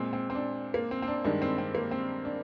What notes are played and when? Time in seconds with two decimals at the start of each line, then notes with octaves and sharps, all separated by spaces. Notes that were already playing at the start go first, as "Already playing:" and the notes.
Already playing: A#2 G#3 C4
0.13 C4
0.30 C4
0.35 D4
0.74 A#3
0.91 C4
1.02 C4
1.08 D4
1.24 G2 D#3 G#3 D4
1.42 C4
1.58 C4
1.75 A#3
1.91 C4
2.25 D4